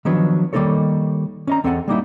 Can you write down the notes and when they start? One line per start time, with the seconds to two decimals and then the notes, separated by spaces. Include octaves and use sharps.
0.05 D#3 F3 F#3 B3 D4
0.53 D#3 G3 A#3 D#4 A4 C#5
1.47 C#4 D#5 A#5
1.64 E2 C4 A4 D5 D#5 F#5
1.88 G3 A#3 D#4 E4